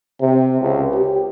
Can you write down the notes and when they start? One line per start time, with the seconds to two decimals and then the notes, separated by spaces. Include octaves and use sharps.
0.21 C3
0.61 C#2
0.94 G4